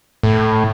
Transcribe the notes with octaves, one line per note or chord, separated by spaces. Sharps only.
A2